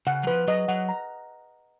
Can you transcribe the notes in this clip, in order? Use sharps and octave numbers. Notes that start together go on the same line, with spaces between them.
C#3 F#5
F#3
F3 B4
F#3 D#5
F#3 F#5
A#5